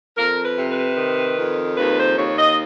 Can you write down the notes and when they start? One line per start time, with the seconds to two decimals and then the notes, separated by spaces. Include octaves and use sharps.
0.17 F2 A#4
0.44 B4
0.57 C3
0.71 B4
0.97 D#3
1.37 F2
1.77 D#2 B4
1.98 C5
2.17 D#2 C#5
2.38 D#5